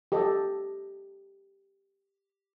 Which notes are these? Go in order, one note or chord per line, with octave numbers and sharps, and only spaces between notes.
G4 A4 D#5